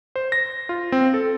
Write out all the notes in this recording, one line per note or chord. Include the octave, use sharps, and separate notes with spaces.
C5
A#6
F4
C4
A4